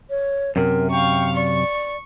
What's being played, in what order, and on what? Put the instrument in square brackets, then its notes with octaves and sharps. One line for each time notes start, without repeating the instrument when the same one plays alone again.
[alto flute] C#5
[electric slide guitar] F#2 C3 [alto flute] A#4
[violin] F5 C#6 [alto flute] G5
[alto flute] D5 [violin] C#6